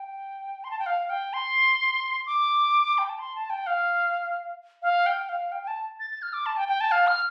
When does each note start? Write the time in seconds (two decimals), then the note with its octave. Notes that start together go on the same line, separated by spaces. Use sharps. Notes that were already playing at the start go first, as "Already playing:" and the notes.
Already playing: G5
0.64 C6
0.71 A5
0.79 G5
0.86 F5
1.10 G5
1.33 C6
2.26 D6
2.98 G5
3.09 A5
3.19 C6
3.36 A5
3.50 G5
3.67 F5
4.82 F5
5.06 G5
5.29 F5
5.52 G5
5.63 G5
5.68 A5
5.99 A6
6.10 A6
6.22 F6
6.33 D6
6.46 A5
6.57 G5
6.68 G5
6.81 A5
6.91 F5
7.07 F6